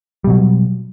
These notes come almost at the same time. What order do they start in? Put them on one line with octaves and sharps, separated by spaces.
G3 B2 F#3